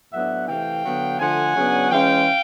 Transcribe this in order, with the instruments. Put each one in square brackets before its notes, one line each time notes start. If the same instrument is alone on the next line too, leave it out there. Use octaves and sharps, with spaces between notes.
[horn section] A2 F#3 B3 D4 E5 F#5
C3 E3 A3 F5 G5
D3 F#3 B3
D3 F3 A3 F#5 G#5
C#3 F#3 B3 D4
E3 G#3 C#4 F5 G5